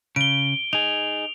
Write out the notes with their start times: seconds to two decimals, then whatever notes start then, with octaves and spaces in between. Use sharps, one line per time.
0.16 C#3 D7 G7
0.73 D#4 G#4 F7